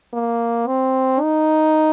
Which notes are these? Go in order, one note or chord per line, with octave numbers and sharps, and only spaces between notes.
A#3
C4
D#4